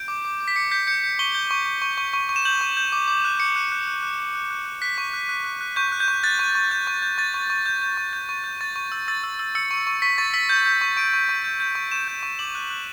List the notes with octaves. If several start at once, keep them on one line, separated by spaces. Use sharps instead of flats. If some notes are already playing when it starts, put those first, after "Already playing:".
Already playing: G6 D7
D6
D6
D6
B6
D6 C#7
G6 B6
G6 C#7
G6
C#6 G7
G6 G7
C#6
C#6
C#6
C#6
C#6
C#6
E7
G6 F#7
C#6
G6
D6
D6
F#6
D6 C#7
F#6
F#6
F#6
F#6
F#6
F#6
F#6
F#6
F#6 B6
C#6
F#6
F#6
F#6
F#6
C#6 G6
F#6
G6
C#6
F#6 A6
C#6
C#6
G6
C#6
G6
C#6 A6
C#6
C#6
G6
G6
C#6
G6
C#6
G6
C#6 A6
C#6
E6
E6 A6
E6
E6
E6 C#7
C#6
C#6
C#6 B6
C#6 A6
E6 B6
G6
G6
C#6
C#6 D7
C#6
C#6
G6
G6
C#6
C#6 E7
G6
C#6
D6 F#7
F#6
F#6